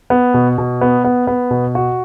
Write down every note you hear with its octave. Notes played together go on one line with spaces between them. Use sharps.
B3
B2
B2
B3
B3
B3
B2
F#4